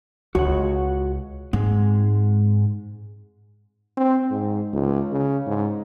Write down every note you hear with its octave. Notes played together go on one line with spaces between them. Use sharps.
C#2 F#4 C#5 F#5
G#2 G#3 C4
C4
G#2
C#2
C#3
G#2